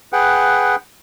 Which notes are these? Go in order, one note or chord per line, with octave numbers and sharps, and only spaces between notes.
G#4 B4 F#5 G5